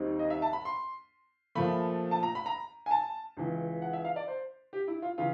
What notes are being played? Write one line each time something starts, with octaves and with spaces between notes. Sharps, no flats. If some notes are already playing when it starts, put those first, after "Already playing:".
Already playing: D#2 D#3 G3 C4 D#4
D#5
E5
A5
B5
C6
A#2 F3 A3 B5
A5
A#5
B5
A#5
G#5
A5
C#2 C#3 E3
F#5
E5
F5
D5
C5
G4
E4
F4
C#3 E3 F4